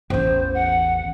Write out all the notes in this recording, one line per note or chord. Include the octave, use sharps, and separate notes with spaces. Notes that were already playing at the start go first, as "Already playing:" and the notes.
A1 E2 C5
F#5